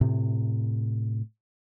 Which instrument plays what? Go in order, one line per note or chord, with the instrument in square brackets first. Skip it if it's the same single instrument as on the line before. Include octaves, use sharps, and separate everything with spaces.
[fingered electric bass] A2 C3